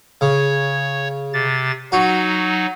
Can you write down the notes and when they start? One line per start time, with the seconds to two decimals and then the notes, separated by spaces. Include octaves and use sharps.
0.21 C#3 C#5
1.33 C3 A6
1.92 F#3 D#4 F#4